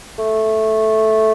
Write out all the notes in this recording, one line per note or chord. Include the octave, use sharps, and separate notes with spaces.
A3